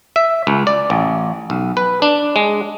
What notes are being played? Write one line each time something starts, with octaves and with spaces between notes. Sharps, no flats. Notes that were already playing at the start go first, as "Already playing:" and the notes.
E5
C#2
D5
A1
B1
B4
D4
G#3